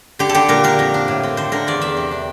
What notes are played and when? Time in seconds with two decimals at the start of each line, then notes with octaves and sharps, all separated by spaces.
0.19 D3 G4
0.29 A4
0.34 D3 G4
0.48 A#2 A#4
0.64 D4 A#4
0.79 F2
0.94 D4
1.08 A2
1.23 C4
1.37 D3 C5
1.52 D3 A#4
1.67 E2 D5
1.81 E2 E5
1.97 C3
2.11 D4